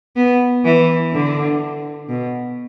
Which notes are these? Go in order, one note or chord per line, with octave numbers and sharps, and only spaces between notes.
B3
E3
D3
B2